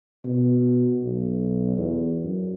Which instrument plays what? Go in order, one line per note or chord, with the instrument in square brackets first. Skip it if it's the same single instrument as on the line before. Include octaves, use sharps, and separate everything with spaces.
[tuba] B2
B1
E2
F#2